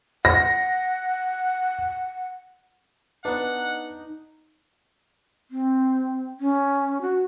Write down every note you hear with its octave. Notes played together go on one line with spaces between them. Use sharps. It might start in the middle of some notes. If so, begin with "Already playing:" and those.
F#5 A#6
B3 D4 D#4 B4 F#5
C4
C#4
F#4